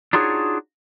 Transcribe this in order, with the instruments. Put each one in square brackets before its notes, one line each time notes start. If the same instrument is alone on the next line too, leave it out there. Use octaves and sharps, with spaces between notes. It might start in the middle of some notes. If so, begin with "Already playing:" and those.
[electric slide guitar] D4 D#4 F4 F#4 G#4 C#5